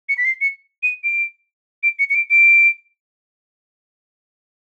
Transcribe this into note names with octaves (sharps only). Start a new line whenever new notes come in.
C#7
B6
C7
C#7
D#7
D7
D7
C#7
C#7
D7
D7